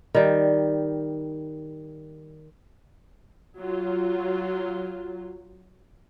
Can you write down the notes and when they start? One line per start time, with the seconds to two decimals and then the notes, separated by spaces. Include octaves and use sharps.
0.15 D#3 G3
3.60 F#3 F4